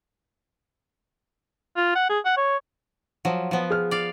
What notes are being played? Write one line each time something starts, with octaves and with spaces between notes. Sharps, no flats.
F4
F#5
G#4
F#5
C#5
F3 F#3
F3 B3
G#4 F6
D5 F5